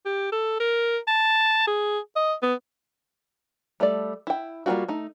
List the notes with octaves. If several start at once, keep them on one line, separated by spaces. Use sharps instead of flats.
G4
A4
A#4
A5
G#4
D#5
B3
G3 A3 A4 D5
E4 G5
G3 A#3 C4 F4 F#4
A3 D#4